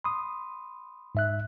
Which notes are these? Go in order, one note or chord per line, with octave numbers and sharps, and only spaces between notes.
B5 C6 D#6
G#2 E5 F#6